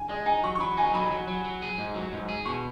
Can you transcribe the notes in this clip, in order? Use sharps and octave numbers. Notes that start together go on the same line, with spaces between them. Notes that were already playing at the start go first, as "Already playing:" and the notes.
Already playing: G#5
G#3 D#5
D#4 G#5
F#3 C#6
C#6
F#3 B5
D#4 G#5
F#3 B5
F#3
F#3
F#3
G#4
G#2
F#3
G#2
G#4
B2 C#6